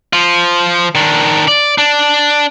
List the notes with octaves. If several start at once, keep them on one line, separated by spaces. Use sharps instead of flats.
F3 F4
D#3 D4
D5
D4